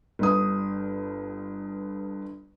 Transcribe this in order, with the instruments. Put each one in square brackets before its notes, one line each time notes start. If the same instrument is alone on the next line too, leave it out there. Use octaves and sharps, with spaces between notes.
[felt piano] G1 G2 D#6